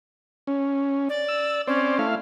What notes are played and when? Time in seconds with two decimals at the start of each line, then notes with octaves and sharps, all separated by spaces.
0.47 C#4
1.09 D5
1.28 E6
1.67 C4 C#4 C5 D5
1.99 A3 E4 F5